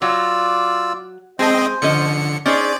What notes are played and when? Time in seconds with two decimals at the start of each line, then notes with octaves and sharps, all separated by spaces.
0.02 F#3 F4 D5 E6
1.39 G#3 C4 G#4 C5 D#5
1.82 D3 F3 C#4 D#5 C#7
2.46 C#4 D#4 G#4 C5 D5 G#5